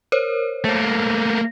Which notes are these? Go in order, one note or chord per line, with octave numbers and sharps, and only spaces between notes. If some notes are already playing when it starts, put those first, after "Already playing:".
A#4 C5 C#5
A3 A#3